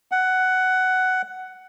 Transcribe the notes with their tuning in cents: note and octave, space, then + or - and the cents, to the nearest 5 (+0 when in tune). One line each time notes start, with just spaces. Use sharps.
F#5 +10